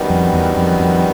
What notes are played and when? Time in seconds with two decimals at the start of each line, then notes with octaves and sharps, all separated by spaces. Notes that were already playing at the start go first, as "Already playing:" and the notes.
Already playing: F#2 D#3 G3 B3
0.10 F2
0.33 E2
0.57 F2
0.80 F2